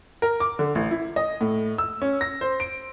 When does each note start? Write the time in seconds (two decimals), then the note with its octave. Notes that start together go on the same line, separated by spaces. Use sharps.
0.22 A#4
0.40 D6
0.59 D3
0.75 A1
0.91 E4
1.16 D#5
1.41 A2
1.78 E6
2.02 C#4
2.21 A#6
2.41 C5
2.60 D7